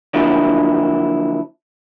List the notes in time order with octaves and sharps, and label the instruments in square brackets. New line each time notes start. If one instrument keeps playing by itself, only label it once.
[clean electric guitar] D3 F3 F#3 A#3 D4 E4